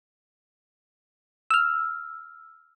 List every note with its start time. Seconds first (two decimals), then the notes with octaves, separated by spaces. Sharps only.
1.51 E6 F6